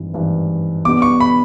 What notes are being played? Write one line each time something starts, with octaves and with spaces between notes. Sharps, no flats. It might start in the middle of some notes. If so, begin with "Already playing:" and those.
Already playing: G#1 G2 E3
G#1 G2 E3
B1 B2 G3 B3 D4 D6
C#6
B5